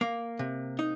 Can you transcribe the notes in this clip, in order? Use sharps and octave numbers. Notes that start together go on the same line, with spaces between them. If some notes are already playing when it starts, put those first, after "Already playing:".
A#3
C3
D#4